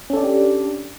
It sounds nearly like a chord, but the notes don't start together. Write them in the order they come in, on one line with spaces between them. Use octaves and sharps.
C#4 A4 D5 D4 G4